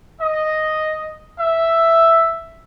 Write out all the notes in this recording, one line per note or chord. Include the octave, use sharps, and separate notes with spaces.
D#5
E5